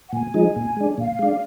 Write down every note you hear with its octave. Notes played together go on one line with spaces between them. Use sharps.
F#5
A#2 G#5
F3 G#3 D#4
A#2
G#3 D4
A#2 F5
G#3 D4